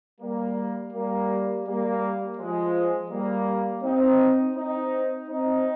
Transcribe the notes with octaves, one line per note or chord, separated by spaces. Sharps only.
G3 A#3
G3 A#3
G3 A#3
F3 G#3
G3 A#3
C4 D#4
C4 D#4
C4 D#4